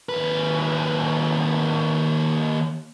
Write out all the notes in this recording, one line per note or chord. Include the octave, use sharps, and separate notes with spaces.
D#2 B4